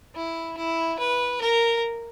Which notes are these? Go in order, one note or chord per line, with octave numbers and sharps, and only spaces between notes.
E4
E4
B4
A#4